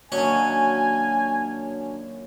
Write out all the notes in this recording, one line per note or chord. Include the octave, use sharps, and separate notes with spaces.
F#2 A#2 D#3 C#4 D4 F#4 C#5 G#5